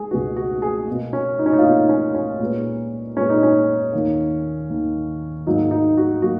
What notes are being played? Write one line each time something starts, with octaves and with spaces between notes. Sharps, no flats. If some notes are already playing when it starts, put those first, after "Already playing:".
Already playing: G#3 G#4
C#2 B2 G#3 B3 F#4
F#4
G#4
B2 A#3
C#4
D#4
C#4
D#4
F4
B2 A#3 D#4
C#4
C#4
A#2 G#3 B3
A#2 G#3 B3 C#4
D#4
C#4
D#2 D#3 A#3
D#2 D#3 A#3
G#2 F#3 A#3 D#4
D#4
F#4
F#3 A#3 F#4